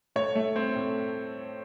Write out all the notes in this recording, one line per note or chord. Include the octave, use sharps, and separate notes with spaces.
A2 C#5
A3
C4
A2